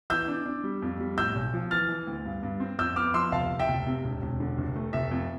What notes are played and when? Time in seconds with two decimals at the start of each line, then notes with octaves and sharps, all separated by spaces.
0.10 E3 E6 G6
0.28 D4
0.45 D4
0.64 G3
0.82 F2
1.00 G3
1.17 A2 E6 G6
1.35 B1
1.53 F3
1.71 E3 F6 A6
1.89 E3
2.07 D2
2.25 G2
2.43 G2
2.60 C4
2.79 F2 E6 G6
2.96 B3 D6 F6
3.14 F3 C6 E6
3.32 F1 F5 A5
3.50 F1
3.59 E5 G5
3.68 F1
3.86 C3
4.04 E1
4.22 E1
4.40 D3
4.58 F1
4.76 A3
4.93 F1 E5
5.11 F2